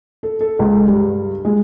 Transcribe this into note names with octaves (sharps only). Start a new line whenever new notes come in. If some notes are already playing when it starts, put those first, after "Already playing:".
A4
A4
C#2
G2
G#3